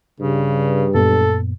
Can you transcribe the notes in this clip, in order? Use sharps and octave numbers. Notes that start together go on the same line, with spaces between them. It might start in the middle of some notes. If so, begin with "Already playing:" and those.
G2 C#3
F#2 A#2 B3 A4